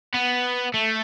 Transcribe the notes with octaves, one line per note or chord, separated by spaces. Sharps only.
B3
A3